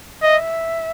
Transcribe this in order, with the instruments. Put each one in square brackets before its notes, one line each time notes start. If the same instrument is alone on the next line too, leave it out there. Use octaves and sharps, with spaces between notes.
[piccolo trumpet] D#5 [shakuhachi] E5